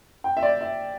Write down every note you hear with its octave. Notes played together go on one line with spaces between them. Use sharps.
G5
E5
D5
E5